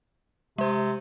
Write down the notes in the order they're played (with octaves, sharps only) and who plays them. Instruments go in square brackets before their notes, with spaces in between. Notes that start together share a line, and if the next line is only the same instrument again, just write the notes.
[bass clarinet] C3 [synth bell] G#3 C5